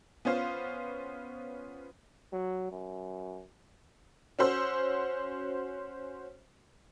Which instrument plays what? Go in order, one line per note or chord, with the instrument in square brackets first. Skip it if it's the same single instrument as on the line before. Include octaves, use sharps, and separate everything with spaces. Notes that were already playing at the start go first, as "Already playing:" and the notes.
[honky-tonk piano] B3 C#4 F4 C5 F5
[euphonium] F#3
F#2
[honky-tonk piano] C#4 F#4 C5 E6